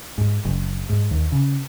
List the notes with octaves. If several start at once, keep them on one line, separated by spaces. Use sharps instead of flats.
G#2
F#1
G#2
D#2
C#3